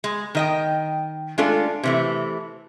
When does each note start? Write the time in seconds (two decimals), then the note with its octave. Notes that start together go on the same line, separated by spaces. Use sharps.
0.04 G#3
0.35 D#3 D#5 G5
1.38 G#3 A3 D4 F4 A4 D5
1.83 C3 E3 A3